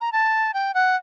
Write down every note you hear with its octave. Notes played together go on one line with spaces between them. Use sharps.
A#5
A5
G5
F#5